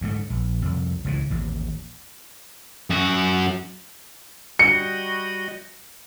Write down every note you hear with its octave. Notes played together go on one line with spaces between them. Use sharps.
D2 G#2 A3
A#1
C2 F2
C#2 A2 E3
A1 D#2
F#2 F#4
G3 F#4 D#5 C#7